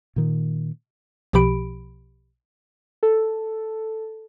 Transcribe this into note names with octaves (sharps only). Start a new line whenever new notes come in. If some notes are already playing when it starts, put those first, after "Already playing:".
A#2 D#3
B1 B2 F3 G4 B5 D7
A4